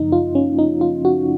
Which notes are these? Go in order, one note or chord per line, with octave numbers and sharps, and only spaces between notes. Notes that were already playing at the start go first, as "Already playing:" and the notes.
Already playing: F#2 C#3 F3 A#3 D#4
F4
C#4
D#4
F4
F#4